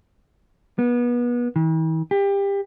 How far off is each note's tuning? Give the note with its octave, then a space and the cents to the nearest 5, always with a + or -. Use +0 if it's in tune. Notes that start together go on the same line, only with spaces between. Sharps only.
B3 -30
E3 -45
G4 +25